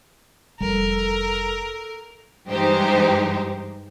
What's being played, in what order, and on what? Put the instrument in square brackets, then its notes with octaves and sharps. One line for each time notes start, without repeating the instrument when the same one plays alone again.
[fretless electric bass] F1 G3 [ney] A4 [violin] A#4
[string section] G2 E3 G#3 D#4 G4 C5